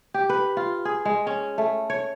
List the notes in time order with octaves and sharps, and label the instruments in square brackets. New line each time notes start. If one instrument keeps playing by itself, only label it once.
[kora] G4
B4
F4
G#4
G#3
C#4
A3
C#5